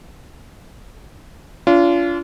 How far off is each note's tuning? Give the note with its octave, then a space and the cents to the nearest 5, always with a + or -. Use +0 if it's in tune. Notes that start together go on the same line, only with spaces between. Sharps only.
D4 -45 F4 -25